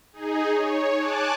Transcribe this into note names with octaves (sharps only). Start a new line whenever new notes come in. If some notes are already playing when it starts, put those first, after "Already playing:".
D#4 G#4
C#5
G#5 A5 D6 F#6